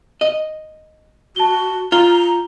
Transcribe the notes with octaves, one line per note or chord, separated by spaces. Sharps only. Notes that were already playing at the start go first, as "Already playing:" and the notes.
D#5
F#4 A5 G7
F4 A#5 G7